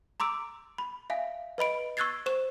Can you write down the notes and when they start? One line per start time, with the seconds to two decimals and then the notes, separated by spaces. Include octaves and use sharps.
0.20 A#5 C6 D6 E6 D7
0.78 B5
1.10 E5 F5 G#5
1.58 B4 D#5 B5 D7
1.97 C#6 E6 F#6 G#6 A6 C7
2.26 C5 C#6 E7